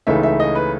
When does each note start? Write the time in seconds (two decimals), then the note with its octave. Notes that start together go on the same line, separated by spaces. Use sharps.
0.07 C#2 C#3 E3 A3 D#4 E5
0.23 E5
0.40 D#5
0.55 B4